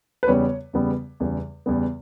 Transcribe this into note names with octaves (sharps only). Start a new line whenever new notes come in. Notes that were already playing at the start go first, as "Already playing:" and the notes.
B4
E2 C#3 G3 B3 C#5
E2 C#3 G3 B3
E2 C#3 G3 B3
E2 C#3 G3 B3